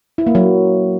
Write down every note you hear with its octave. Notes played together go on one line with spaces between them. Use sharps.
E4
A#3
F#3